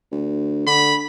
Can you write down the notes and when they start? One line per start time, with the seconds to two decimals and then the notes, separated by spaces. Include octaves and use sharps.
0.12 D2
0.67 D3 B5